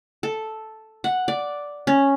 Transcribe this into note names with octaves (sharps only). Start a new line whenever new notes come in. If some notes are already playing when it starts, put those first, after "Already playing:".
A4
F#5
D5
C#4